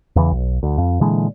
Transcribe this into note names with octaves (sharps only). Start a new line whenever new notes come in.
E2 C#3 E3
B1
D2
F2
A#2 D3 E3 G#3